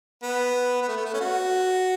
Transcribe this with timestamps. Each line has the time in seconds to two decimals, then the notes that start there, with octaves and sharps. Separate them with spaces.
0.23 B3
0.81 B3
0.88 A3
0.97 B3
1.05 A3
1.13 C#4
1.21 F#4